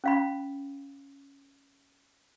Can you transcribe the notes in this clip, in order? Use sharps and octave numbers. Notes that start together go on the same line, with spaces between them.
C#4 F5 B5